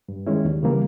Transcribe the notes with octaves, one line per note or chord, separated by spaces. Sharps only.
G2
D#3 G#3 C#4 E4
D#2
C#3 E3 G3 A#3